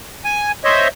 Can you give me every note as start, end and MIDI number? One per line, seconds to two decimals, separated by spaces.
0.25 0.52 80
0.64 0.88 72
0.64 0.88 73
0.64 0.88 75
0.64 0.88 76